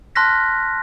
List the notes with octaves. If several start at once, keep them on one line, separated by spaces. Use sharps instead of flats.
A5 C6 F6 F#6 A#6 B6